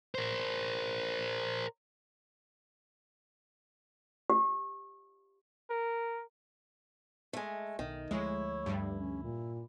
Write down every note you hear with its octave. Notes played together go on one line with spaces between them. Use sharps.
A#4 C5
G4
A#4
G#3 A3
B1 D#3
D2 F3 G#3 A3 E4 C#5
G2 G3
C#4
A#2